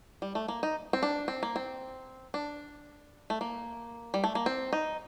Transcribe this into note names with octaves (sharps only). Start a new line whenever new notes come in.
G3
A3
A#3
D#4
C4
D4
C4
A#3
C4
D4
A3
A#3
G3
A3
A#3
C4
D#4